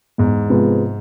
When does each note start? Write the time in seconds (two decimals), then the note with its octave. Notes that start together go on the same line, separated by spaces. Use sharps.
0.18 E2 G#2
0.50 C3 F3 G#3 B3